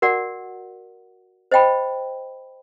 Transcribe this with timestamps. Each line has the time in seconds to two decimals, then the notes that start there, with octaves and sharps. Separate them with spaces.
0.02 F#4 A#4 D5 F#5
1.51 C5 D#5 G5 B5